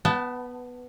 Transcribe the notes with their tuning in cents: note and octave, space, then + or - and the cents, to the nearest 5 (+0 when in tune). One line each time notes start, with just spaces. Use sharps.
B3 +0 F#5 +45 A5 +0